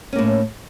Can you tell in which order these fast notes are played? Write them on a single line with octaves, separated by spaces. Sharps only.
C#4 A#3 A2